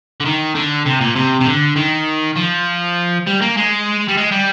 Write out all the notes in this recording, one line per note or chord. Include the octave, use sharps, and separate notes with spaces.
D3
D#3
D3
C3
A#2
C3
C3
D3
D#3
F3
G3
A#3
G#3
G3
G#3
G3